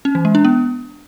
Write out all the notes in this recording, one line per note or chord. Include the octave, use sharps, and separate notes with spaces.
C#4
E3
G#3
D4
B3